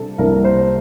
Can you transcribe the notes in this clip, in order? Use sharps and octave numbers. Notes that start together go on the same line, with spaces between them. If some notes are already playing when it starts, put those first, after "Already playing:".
Already playing: C3 G3 D4 A4
C2 C3 G3 A#3 D4 A#4
C5